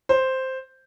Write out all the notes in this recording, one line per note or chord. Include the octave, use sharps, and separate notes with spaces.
C5